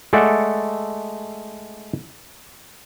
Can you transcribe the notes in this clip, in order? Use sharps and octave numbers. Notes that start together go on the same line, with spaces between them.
G#3 A3 A4 D5 F#5